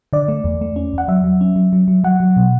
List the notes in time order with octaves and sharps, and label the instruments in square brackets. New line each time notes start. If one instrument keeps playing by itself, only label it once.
[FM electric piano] D3 D5
A3
E2
A3
C#4
E2 F#5
F#3 E5
F#3
C#4
F#3
F#3
F#3
F#3 F#5
F#3
B2